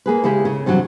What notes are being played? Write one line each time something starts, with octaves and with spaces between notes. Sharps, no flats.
A#3 G#4 B4
C#3 G#3 E4 G4 G#4
C#3
G2 C3 E3 F#3